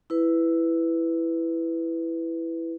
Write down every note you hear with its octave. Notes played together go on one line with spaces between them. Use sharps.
E4 B4